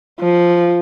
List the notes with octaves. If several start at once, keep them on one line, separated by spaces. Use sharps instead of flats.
F3